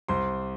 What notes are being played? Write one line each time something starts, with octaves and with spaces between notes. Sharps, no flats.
C2 C5 C6